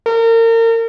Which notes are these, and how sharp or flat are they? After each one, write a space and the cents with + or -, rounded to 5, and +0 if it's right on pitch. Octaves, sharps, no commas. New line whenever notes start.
A#4 -35